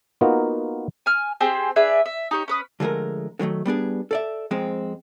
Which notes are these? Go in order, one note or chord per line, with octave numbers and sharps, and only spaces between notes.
A#3 B3 D#4 F4 F#4 A#4
G#5 F6
C4 G4 G#4 C5
D4 G#4 B4 E5
E5
D#4 G4 C#5
C#4 B4 D#6
D3 F3 G#3 A3 A#4
D3 D#3 F#3 A3
G3 B3 D4 G#4
A4 D5 E5
F2 G#3 C4